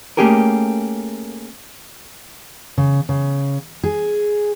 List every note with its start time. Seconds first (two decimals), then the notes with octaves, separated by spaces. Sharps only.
0.17 A3 A#3 C#4 G4 G#4 A#4
2.78 C#3
3.09 C#3
3.83 G#4